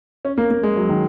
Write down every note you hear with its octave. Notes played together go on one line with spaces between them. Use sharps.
C#4
A#3
A#3
G#3
F#3
D#3